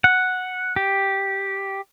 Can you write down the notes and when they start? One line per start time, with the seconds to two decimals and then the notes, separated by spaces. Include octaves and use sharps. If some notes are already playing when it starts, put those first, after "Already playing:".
0.04 F#5
0.76 G4